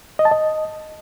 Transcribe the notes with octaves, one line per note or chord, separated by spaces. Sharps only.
D#5
A5
D#5